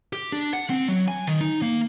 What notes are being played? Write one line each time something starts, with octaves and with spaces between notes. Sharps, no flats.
G4
D4
F#5
C4
F#3
G#5
D#3
D#4
A#3